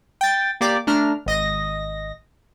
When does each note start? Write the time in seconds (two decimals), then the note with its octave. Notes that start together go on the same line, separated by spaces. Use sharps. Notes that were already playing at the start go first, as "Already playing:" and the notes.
0.21 G5 A6
0.61 A#3 G4 D5 D6
0.87 A3 D4 A#5 F6
1.26 G#1 D#5 A#6